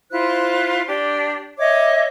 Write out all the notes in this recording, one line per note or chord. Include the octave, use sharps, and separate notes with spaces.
E4 F4 C5 F#6
D4 G4
C#5 D#5 E5 D6